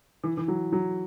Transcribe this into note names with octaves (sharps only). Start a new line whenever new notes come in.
E3
E3
F#3
F#3